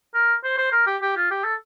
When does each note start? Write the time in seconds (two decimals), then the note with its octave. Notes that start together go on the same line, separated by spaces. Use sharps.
0.14 A#4
0.44 C5
0.58 C5
0.72 A#4
0.87 G4
1.02 G4
1.17 F4
1.31 G4
1.44 A4